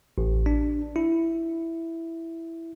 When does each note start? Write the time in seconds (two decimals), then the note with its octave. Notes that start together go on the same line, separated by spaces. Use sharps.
0.18 A1
0.46 D4
0.96 E4